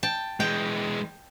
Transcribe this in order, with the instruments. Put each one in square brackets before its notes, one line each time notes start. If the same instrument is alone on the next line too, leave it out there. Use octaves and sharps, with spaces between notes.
[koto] G5 A5
[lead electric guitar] E3 G#3 [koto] G5